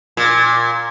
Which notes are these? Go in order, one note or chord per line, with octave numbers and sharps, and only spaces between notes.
A#2